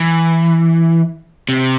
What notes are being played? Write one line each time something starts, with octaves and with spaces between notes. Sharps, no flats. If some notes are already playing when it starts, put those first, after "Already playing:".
Already playing: E3
C3